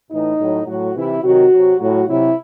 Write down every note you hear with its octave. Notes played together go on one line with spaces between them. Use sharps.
A2 E3 D#4
A2 F#3
A2 F#3 F#4
C3 E3 E4
C3 D#3 F#3 F#4
C3 F#3
A2 F#3 F#4
C3 F#3 E4